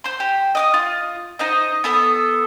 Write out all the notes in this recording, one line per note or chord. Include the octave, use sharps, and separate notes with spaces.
C5 C6
G4
D#5 D6 D#6
F4
D#4 C5 D#5
B3 A4 D#6